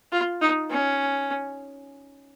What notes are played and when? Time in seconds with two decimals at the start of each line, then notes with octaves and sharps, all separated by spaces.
0.12 F4
0.41 D#4
0.70 C#4